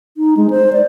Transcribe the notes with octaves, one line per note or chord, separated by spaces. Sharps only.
D#4
G#3
C5
D5